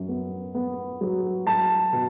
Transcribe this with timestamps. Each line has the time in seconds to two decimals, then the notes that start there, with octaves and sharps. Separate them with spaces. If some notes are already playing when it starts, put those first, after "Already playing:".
Already playing: F#2
0.09 B3
0.55 B3
1.01 F#3
1.46 F#3 A5
1.93 B2